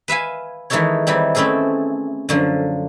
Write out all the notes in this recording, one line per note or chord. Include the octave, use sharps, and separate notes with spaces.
B4 E5 F5 G#5
D#3 E3 G#3 D#4 A4 C#5
D#3 E3 G3 C4
A3 C4 C#4 E4 G#4 A4
F#2 D3 F3